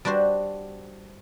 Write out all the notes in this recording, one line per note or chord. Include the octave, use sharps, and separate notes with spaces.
G3 D4 F#4 C5